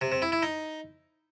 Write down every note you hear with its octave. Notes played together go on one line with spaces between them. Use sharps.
C3
C3
E4
E4
D#4